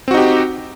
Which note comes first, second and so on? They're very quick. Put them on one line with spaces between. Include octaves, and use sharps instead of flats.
C4 F#4 D#4 G4